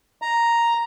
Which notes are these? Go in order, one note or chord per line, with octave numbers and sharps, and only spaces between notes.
A#5